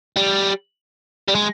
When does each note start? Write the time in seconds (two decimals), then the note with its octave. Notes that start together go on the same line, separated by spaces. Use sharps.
0.16 G3
1.28 G3
1.35 G#3